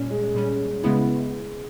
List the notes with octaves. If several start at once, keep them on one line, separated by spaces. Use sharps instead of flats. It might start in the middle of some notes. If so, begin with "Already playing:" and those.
Already playing: A#2 G3 C#4
G#3
G#3
A#2 G3 C#4
C#3 G#3 B3 E4